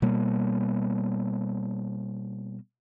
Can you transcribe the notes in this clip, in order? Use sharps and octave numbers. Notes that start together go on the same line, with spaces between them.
B2 G3 A#3